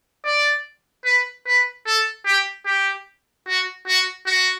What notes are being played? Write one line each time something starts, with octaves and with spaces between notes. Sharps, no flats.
D5
B4
B4
A4
G4
G4
F#4
F#4
F#4